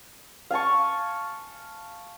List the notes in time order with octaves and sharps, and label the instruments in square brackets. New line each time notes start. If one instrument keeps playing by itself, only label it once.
[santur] F5 G#5 A5 C#6